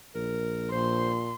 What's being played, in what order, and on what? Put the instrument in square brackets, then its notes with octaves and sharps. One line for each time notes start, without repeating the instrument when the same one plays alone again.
[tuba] A#1 [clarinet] A#4
[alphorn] A#2 [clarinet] C5 [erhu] C6